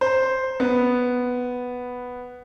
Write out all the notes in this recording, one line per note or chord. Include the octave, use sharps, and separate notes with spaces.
C5
B3